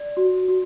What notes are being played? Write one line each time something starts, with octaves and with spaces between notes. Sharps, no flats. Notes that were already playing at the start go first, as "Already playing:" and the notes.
Already playing: D5
F#4
F#4